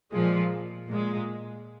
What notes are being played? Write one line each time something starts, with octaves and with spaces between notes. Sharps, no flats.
A#2 F3 G#3
A#2 G#3